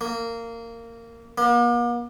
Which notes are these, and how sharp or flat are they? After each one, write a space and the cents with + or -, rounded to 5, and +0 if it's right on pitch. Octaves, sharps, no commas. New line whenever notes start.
A#3 -15
A#3 +45